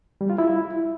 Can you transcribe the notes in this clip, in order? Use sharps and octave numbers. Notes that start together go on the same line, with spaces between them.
G3
F4
E4